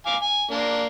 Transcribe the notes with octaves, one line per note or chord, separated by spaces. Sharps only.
F5 G#5 D6
G#5
A#3 D4